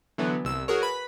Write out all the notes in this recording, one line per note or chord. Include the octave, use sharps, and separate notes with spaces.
D3 E3 F#3 B3
C2 E6
F#4 G#4 A#4 C#5
B4 B5